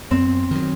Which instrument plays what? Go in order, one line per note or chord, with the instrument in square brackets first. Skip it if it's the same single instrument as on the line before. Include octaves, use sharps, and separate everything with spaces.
[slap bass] F#2 [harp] C4
[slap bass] D#3 F#3